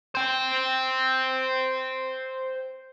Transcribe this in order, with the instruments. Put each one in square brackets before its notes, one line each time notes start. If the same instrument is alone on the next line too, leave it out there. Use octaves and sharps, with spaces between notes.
[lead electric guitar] C5 G5